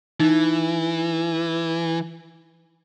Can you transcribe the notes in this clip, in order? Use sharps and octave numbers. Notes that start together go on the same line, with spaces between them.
E3 D#4